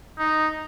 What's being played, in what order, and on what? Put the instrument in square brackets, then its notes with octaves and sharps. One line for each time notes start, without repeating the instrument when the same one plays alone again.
[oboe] D#4